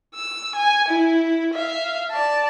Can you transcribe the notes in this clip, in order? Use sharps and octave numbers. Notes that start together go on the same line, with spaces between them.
E6
G#5
E4
E5 F5
D5 A5